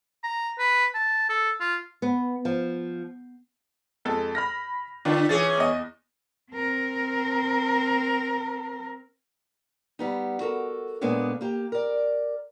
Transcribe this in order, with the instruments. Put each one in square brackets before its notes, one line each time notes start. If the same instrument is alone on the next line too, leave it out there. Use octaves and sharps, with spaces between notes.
[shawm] A#5
B4
A5
A4
F4
[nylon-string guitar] B3
F3
[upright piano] F2 G#3 A4
B5 F6 A#6
[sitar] D3 [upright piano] D4 F4 B4
[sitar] E3 C#4 G#4 [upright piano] A6
[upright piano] E2 D#5
[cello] C4 A#4
[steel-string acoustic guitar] G3 B3 D#4
F#4 A4 A#4
A#2 G#3 A#3 B3 D4 C#5
A#3 G4
A#4 D5